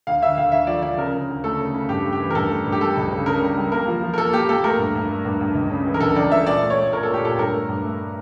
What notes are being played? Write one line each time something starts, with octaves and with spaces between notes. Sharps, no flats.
D2 F5
D2 E5
D2 F5
D2 E5
F3 D5
F3 D5
C#3 A#4
C#3
D2
A3 A4
C#3
C#3
G2 G4
A3
G4
E3
A#4
G2 A4
A3
G2
G4
G3 A4
C#2
C#3
C#3 A#4
G3
G3
A#3 A#4
F3
F3
A#4
A#3 A4
A#3 G4
A#3 A4
A3 A#4
G2
G2
A3
G2
G2
C#2
C#3
E3
A#4
C#2 A4
C#2 D5
E3 E5
A#2 D5
A3
C#5
A3
A#2 A#4
A#2 A4
G4
A#2 A4
G2 A#4
A3
G2
A3